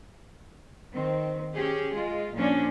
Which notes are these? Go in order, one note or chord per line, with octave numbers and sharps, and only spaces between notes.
D#3 C4
C#4 G4 G#4
G#3 F4
A#2 F3 C#4 D4